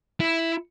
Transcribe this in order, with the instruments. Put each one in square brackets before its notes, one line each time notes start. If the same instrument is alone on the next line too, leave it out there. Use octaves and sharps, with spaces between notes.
[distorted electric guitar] E4